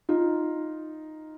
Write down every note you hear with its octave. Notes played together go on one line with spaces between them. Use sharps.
D#4 F4